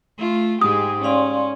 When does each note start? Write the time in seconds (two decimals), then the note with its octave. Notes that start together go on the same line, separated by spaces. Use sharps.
0.19 A3 F4
0.61 G#2 G#3 G4 D#6
1.04 C#4 D5 F5 C6